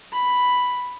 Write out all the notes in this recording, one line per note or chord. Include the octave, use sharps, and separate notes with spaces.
B5